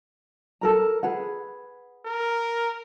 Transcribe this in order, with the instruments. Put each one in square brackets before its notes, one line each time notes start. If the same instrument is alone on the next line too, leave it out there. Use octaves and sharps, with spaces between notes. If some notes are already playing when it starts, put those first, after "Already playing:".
[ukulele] A4 A#4 A#5
G#4 B4 F#5
[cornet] A#4